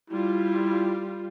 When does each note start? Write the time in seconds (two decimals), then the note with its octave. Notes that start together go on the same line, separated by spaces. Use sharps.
0.10 G3 E4 F4